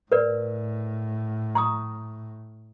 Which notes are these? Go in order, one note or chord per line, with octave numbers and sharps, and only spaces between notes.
A2 A#4 B4 D5
A#5 C#6 D#6